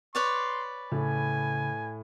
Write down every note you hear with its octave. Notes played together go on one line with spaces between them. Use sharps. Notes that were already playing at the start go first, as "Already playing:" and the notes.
B4 C#5 D5 C6
A2 C#3 G#5